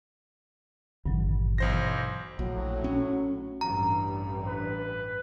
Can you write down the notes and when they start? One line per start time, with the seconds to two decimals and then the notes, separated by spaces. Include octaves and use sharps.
1.06 G#1 G2 A#2 D3 E3 F#3
1.58 B1 E3 C5 A#6
2.39 A#1 A2 F#3
2.84 C#4
3.61 A1 G2 A#5
4.47 B4